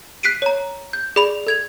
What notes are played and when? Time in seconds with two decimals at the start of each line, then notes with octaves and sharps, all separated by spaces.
0.23 F#6 B6 C7 D7 D#7
0.42 C#5 A#5
0.93 G6
1.16 G#4 D5 B5 F7
1.47 A4 G#6 F7